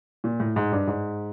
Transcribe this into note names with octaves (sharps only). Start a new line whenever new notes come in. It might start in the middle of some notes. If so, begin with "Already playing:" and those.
A#2
A2
G#2
G2
G#2